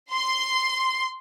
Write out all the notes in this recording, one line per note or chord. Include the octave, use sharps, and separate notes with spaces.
C6